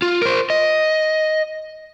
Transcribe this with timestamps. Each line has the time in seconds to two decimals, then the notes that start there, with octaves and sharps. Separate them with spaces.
0.02 F4
0.22 A#4 C5
0.50 D#5